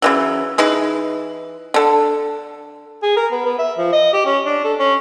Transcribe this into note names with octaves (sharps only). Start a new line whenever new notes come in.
C#3 E3 F#3
E3 D#4 G#4 B4
D3 A4
G#4
A#4
B3
B3
E5
F3
D#5
G4
C#4
D4
A4
C#4